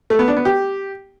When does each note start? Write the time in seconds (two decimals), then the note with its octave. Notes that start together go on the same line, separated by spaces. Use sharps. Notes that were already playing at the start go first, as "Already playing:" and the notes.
0.10 A3
0.19 B3
0.28 D4
0.37 B3
0.45 G4